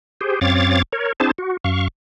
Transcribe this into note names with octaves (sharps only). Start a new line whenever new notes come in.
G4 G#4 C5
F#2 C4 C#5 F5 D6 A6
A#4 C#5
C4 D4 E4 G#4 C5 A5
F#4
F#2 F5 C#6